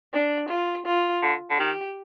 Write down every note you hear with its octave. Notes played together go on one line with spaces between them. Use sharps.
D4
F4
F4
D3
D3
D#3 G4